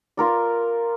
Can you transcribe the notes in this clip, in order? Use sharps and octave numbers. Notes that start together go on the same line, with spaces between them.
F4 A#4 D5